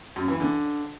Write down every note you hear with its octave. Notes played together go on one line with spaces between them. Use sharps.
F#2
E3
D3